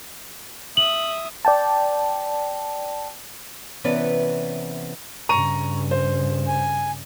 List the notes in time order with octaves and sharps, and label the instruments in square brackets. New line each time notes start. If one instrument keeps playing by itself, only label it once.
[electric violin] E5 D#6 [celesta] F#7
[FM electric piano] D5 G5 A5
[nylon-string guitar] C3 E3 B3 C#4 B4 D5
[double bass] G2 C#3 [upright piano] A#5 C#6 D#7
[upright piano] C5
[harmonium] G#5